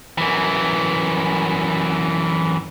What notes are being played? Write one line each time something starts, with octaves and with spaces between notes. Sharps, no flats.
F#2 E3